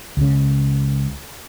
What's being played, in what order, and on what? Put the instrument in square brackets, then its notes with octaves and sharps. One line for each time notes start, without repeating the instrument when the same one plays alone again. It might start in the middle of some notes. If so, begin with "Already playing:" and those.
[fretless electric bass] C#2 C#3